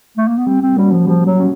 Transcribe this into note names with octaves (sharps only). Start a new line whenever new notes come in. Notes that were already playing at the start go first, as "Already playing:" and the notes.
A3
A#3
B3
G3 C4
C4
G3 A#3 C#4 F#4
F3
F3 G3
F#3
C#4 F#4